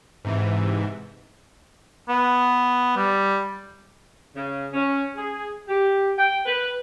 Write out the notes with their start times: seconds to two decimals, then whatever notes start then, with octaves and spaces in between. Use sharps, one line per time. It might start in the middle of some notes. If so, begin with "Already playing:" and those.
0.25 G#2 C3 E3
2.09 B3
2.97 G3
4.35 C#3
4.73 C#4
5.16 G#4
5.68 G4
6.17 G5
6.46 B4